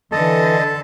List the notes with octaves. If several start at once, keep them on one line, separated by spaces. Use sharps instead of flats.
D3 E3 A4 D#5 A5